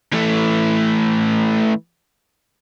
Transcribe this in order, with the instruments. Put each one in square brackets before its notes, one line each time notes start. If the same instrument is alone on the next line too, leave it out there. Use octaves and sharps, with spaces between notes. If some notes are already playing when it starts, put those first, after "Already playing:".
[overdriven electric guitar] E3 A3